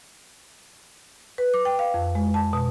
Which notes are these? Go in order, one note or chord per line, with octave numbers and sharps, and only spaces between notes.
B4
D6
G5
F5
F2
G#3
A5
B2